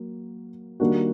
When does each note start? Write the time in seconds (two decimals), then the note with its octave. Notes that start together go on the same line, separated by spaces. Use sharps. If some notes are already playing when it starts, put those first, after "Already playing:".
Already playing: F#3 A#3
0.80 D#3 G3 A#3 D4 F#4